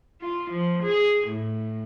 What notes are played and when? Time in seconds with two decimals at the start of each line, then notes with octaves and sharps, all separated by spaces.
0.21 F4
0.51 F3
0.83 G#4
1.28 A2